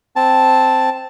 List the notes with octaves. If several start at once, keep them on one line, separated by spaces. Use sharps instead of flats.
C4 A5